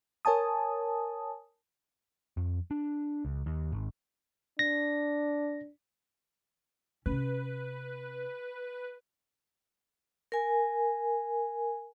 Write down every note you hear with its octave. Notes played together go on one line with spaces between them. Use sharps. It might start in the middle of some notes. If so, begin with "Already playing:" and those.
A#4 C#5 G#5 A5 D#6
F2
D4
C#2
D#2
G#1
D4 A#6
C3 C#4 B4
A#4 G#5